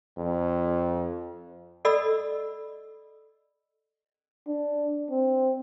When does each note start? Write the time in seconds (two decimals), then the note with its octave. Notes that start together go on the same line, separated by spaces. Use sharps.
0.18 F2
1.85 A4 D5 D#5 B5 E6
4.47 D4
5.10 C4